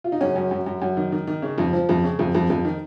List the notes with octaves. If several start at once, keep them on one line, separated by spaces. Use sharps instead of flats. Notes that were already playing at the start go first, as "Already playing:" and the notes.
F4
D#4
F#2 C#3 C#4
F#2
F#2
F#2
F#2
D#3
D#3
D#3
C#3
F2
F3
F2
C#3
F2
F2
F2
D#3